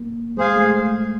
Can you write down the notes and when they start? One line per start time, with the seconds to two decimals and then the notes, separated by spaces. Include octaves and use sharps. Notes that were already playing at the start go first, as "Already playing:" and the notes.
Already playing: A#3
0.37 G#3 G#4 C5 F5 G#5
0.56 A3